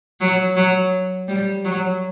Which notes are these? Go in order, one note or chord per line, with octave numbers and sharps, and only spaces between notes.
F#3
F#3
G3
F#3